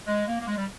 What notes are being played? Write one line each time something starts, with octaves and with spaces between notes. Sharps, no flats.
G#3
A#3
A#3
G#3
G3